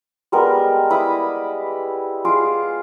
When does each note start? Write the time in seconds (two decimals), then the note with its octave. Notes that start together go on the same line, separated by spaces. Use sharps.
0.32 G3 G#3 B3 A#4
0.90 E4 B5 D6 D#6
2.25 F4 G#4 D6